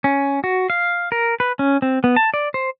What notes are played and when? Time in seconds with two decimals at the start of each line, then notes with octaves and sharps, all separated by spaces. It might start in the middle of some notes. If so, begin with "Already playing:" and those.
0.04 C#4
0.44 F#4
0.70 F5
1.12 A#4
1.40 B4
1.59 C#4
1.82 C4
2.04 B3
2.16 A5
2.34 D5
2.54 C5